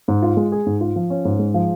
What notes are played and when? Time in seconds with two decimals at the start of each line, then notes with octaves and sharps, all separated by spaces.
0.08 G#2
0.22 F4
0.37 G#3
0.52 G#4
0.66 G#2
0.81 F4
0.96 F3
1.10 C#4
1.25 G#2
1.39 G#3
1.54 F3